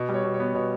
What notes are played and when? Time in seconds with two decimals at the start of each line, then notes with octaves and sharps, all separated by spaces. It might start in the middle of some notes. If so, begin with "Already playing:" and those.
Already playing: B2
0.09 G3
0.14 C#5
0.24 B2
0.34 C#5
0.40 B3
0.55 B2 C#5